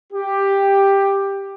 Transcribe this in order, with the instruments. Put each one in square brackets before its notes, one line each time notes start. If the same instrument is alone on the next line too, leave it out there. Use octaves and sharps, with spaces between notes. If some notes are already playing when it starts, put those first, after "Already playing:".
[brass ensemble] G4